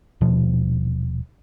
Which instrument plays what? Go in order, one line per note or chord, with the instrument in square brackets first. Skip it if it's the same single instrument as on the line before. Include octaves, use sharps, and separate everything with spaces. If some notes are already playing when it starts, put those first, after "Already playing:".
[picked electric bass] D#1 B2 F3